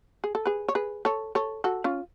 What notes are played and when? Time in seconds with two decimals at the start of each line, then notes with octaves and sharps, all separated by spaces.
0.24 G#4
0.35 A4
0.45 G#4 B4
0.68 C#5
0.75 G#4 B4
1.05 A4 C#5
1.35 A4 C#5
1.64 F#4 A4
1.84 C#4 F4